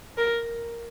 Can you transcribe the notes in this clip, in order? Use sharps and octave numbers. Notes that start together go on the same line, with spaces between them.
A#4